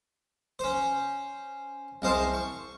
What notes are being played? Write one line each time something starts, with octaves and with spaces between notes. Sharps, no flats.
C#4 C5
C2 G#3 C5 F5 A5
C#6